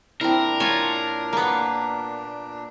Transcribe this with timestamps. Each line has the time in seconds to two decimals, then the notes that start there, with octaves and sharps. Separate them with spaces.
0.21 A#2 C4 D4 E4 A#4
0.60 F4 C#5 G#5 A5 C6
1.33 A#3 B3